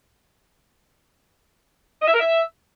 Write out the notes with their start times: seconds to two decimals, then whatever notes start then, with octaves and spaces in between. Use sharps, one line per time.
2.01 D#5
2.07 E5
2.13 A#4
2.20 E5